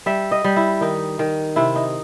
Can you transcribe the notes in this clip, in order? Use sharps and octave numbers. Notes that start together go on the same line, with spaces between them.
G3 E5
D#5
G3
E4
D#3 D#4
D#3
C3 E4
D#4